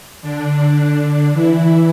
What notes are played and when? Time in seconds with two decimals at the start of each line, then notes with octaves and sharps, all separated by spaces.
0.22 D3 D4
1.33 E3 E4